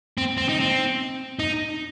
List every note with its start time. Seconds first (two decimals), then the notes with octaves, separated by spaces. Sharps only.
0.18 C4
0.37 C4
0.49 D#4
0.60 C4
1.39 D#4